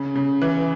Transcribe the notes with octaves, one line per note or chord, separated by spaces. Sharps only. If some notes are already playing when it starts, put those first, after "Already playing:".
Already playing: C#3
C#3
E3